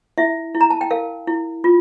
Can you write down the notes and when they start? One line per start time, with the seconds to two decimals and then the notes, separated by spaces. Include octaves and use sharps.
0.18 E4 E5
0.54 E4
0.61 A#5
0.70 A5
0.81 G5
0.91 A#4 F5
1.27 E4
1.64 F4